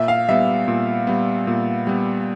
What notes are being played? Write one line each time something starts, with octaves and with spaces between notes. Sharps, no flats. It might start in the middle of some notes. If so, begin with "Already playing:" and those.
Already playing: A#2 E5
F5
G3 B3 E5
A#2
G3 B3
A#2
G3 B3